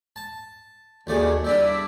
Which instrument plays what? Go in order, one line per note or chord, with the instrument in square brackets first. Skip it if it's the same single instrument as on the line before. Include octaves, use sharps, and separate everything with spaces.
[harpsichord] A5
[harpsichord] D#2 A3 D5 [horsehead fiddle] F#4 G#4
[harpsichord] G3 D4 E4 [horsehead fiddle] D5 E5